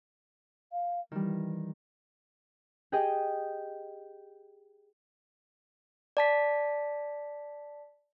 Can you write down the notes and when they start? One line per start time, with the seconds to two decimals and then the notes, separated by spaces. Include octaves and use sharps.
0.72 F5
1.12 D#3 E3 G3
2.92 G4 G#4 D#5 G5
6.17 D5 A5 B6